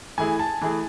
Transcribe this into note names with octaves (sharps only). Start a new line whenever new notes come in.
E3 A3 E4 G#4 G#5
A5
E3 A3 E4 G#4